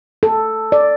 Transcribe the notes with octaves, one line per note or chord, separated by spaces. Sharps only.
A4
D5